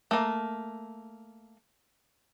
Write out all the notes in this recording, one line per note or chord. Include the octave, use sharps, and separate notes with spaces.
A3 A#3